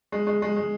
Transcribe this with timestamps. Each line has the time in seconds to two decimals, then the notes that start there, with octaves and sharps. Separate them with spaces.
0.12 G#3
0.27 G#3
0.42 G#3
0.56 G#3